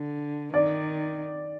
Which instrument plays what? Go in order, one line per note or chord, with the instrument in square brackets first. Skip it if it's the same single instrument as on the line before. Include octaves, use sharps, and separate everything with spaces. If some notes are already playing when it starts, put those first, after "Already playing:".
Already playing: [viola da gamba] D3
[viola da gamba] D#3 [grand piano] D5